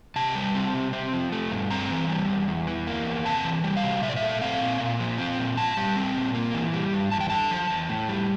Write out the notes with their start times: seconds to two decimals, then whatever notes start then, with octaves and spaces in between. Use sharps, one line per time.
0.16 C3 A5
0.35 G3
0.55 C4
0.74 C3
0.93 C4
1.13 F3
1.32 A3
1.52 G2
1.70 C4 A#5
1.90 E3
2.10 G3
2.28 E2
2.48 E2
2.67 E3
2.87 A#3
3.05 E2
3.25 C3 A5
3.44 E3
3.64 G3
3.77 F5
3.83 C3
4.03 A#2 E5
4.09 D5
4.16 E5
4.22 A3
4.41 C4 F5
4.60 A#2
4.80 A#2
4.99 F3
5.18 C4
5.38 A#2
5.57 A#2 A5
5.77 G3
5.96 C4
6.15 A#2
6.35 A#3
6.54 E3
6.73 G3
6.93 G2
7.12 E2 A5
7.21 G5
7.30 D3 A5
7.51 F3
7.70 E2
7.89 A2
8.09 G3